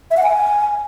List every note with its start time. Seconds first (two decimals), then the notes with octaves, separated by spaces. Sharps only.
0.11 E5
0.17 F#5
0.23 G#5